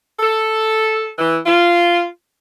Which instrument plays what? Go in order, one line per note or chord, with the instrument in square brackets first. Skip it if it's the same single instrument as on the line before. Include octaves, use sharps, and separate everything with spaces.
[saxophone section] A4
E3
F4